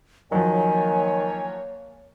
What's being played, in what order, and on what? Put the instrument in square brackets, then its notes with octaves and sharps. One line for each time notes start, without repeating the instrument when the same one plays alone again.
[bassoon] D#3 [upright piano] F3 F#3 [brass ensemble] A#3 C#5 [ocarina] G#5